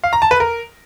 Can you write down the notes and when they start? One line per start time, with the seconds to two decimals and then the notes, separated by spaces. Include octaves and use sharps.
0.04 F5
0.13 A#5
0.22 A5
0.31 B4
0.40 A#4